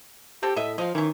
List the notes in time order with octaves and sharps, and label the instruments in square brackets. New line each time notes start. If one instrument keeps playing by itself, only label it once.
[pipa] C4 A4 [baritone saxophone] G4
[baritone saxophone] A2 [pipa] D#5 E5
[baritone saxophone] F3 [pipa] D#5 F5
[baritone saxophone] D#3 [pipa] E3 C#4